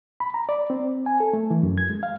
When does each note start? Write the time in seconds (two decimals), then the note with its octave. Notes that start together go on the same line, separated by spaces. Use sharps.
0.20 B5
0.34 A#5
0.49 D5
0.70 C4
1.06 G#5
1.20 A4
1.33 A3
1.50 E3
1.63 F#2
1.78 G#6
1.90 G#3
2.03 F5